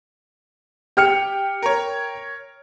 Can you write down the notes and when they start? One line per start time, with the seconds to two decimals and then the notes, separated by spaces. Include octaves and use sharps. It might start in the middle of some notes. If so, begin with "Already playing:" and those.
0.97 G4 G5 F6 C#7
1.62 A#4 C#5